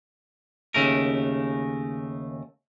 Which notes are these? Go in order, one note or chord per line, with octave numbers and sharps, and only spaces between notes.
D#2 C#3 A3 A#4